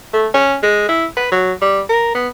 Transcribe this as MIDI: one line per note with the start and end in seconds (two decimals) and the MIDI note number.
0.13 0.28 57
0.34 0.56 61
0.63 0.87 56
0.89 1.05 64
1.17 1.27 71
1.32 1.53 54
1.62 1.80 55
1.89 2.12 70
2.15 2.28 59